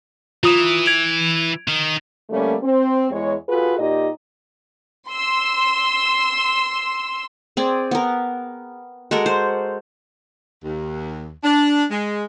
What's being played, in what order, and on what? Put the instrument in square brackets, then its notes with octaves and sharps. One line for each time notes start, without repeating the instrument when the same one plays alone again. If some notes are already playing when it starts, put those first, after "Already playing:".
[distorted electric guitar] E3 [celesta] F4 D#6 E7
[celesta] G#6 D7 F7
[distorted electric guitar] D#3
[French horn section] D3 G3 A3 A#3 C#4
C4
E2 E3 G#3 C#5
F4 F#4 G#4 A4 B4
A#2 D#4 G4 D5 D#5
[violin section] C6 E6
[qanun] C4 G#4 D5
B3 A#4
G#3 F#4 A4 A#4
C5
[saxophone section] D#2
D4
G#3